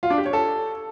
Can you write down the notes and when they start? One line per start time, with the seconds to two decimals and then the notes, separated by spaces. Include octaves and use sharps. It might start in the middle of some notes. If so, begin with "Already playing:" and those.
0.03 F4
0.10 D4
0.18 G4
0.26 C#5
0.33 A4